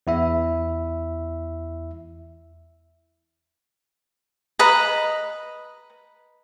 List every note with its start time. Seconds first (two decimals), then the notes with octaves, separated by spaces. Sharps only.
0.07 E2 E4 E5
4.59 B4 D#5 A#5 B5